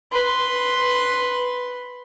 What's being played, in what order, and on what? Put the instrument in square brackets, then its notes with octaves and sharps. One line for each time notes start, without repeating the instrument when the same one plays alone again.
[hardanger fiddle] B4 C6